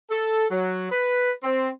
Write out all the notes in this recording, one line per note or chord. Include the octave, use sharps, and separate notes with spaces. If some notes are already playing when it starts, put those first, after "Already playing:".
A4
F#3
B4
C4